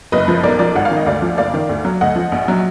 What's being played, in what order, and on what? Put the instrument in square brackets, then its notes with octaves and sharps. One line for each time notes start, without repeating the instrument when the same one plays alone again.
[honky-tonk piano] F#1 B4 D#5
F3
B1 A#4 D5
F3 A#4 D5
G#1 F#5
F5
D#3
D#5
D2 D5 F5
F3
F#1 D5 F5
D#3
D2
F#3
D2 D#5 F#5
F3
A#1
F#3